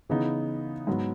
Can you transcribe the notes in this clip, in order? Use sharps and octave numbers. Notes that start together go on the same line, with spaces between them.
C#3 E3 B3 D#4
G#2 F#3 B3